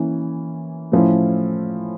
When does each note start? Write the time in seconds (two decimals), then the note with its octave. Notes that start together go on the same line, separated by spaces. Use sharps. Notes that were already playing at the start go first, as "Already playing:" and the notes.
Already playing: E3 A#3 C#4
0.92 A2 F3 C#4 E4